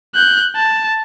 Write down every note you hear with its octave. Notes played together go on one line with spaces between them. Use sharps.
F#6 G6
A5